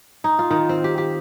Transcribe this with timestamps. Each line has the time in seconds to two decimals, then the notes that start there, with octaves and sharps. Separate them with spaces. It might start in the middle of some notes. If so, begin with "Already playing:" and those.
0.24 D#4
0.39 F4
0.51 D#3
0.69 C4
0.84 G4
0.98 G4